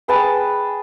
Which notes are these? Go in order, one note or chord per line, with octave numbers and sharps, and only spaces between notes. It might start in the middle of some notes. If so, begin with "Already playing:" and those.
G#4 B4 G5 A5